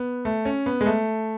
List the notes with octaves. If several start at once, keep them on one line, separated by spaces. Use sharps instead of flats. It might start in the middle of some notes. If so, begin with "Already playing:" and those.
Already playing: B3
A3
C#4
B3
G#3
A3